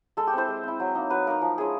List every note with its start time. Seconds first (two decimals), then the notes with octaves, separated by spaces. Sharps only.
0.17 G#3 A4
0.27 G4
0.33 C4 E4 C5
0.48 G#3
0.63 C4 E4
0.80 F#3
0.95 A#3 D#4
1.10 F#3 B4
1.27 A#3 D#4 A#4
1.42 F3
1.58 G#3 C#4 E4 G#4